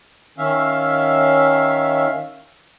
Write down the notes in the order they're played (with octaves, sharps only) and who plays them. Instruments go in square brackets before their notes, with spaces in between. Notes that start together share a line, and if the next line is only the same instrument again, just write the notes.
[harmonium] D#3 C#4 E5 F5